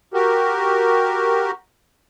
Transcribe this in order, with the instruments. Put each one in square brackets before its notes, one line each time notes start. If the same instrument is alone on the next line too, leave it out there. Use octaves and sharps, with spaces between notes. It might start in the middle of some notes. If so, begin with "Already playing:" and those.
[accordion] F#4 G4 A#4